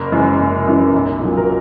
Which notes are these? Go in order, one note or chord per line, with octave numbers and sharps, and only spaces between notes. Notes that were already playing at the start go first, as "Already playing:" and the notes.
Already playing: F#1 A#4
F#2 E3 G#3
F#1
F#2 E3 G#3
B1
A#2 F#3
A#4